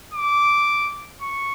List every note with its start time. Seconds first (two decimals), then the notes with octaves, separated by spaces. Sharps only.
0.14 D6
1.22 C#6